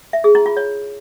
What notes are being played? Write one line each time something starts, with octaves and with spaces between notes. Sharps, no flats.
E5
G#4
E4
F4
C#5